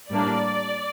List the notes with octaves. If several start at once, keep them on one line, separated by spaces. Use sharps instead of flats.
A2 G3 A#3 D4 D5